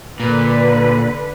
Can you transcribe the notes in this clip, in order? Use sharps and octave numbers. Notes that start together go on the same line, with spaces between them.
A#2 D3 B4